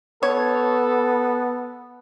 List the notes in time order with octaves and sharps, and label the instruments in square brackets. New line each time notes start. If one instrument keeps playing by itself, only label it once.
[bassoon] B3 [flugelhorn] A4 [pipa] C#5